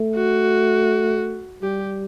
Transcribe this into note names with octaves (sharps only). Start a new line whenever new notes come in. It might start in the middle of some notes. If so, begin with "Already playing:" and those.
Already playing: A3
F#4
G3 G4